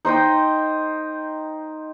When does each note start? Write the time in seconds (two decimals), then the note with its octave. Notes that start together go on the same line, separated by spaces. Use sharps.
0.05 D#4 C5 D#5 G5